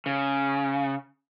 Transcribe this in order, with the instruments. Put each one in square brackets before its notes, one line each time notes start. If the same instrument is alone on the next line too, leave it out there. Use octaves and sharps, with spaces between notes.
[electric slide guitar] C#3